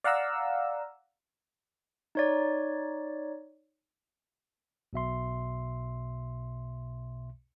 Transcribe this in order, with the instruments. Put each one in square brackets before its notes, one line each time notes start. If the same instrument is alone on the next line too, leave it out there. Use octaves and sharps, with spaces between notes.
[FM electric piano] D5 F5 F#5 A#5 E6
[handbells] D#4 C#5 D5
[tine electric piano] B1 B2 E5 C6